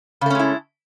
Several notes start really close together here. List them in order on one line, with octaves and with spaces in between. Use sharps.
C#3 A3 C#4 G#3 E4